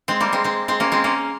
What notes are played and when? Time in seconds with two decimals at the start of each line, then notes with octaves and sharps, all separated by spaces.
0.08 G#3 C4
0.20 G3 A#3
0.33 G#3 C4
0.44 G#3 C4
0.68 G#3 C4
0.80 A#3 C#4
0.92 G#3 C4
1.04 A#3 C#4